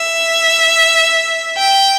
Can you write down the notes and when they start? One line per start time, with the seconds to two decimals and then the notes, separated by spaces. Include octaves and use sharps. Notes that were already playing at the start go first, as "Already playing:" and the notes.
Already playing: E5
1.57 G5